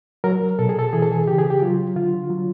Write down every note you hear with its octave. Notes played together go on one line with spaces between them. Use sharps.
F#3 A#4
B2 A4
G#4
A4
E3 G#4
A4
G#4
C#3 G4
G#4
G4
F#3 F4
D3 F4
F#3